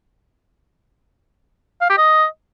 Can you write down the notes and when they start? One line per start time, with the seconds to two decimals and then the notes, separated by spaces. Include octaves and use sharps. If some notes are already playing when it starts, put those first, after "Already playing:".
1.81 F5
1.90 G4
1.98 D#5